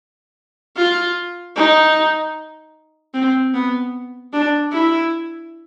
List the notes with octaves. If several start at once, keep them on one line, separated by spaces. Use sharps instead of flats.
F4
D#4
C4
B3
D4
E4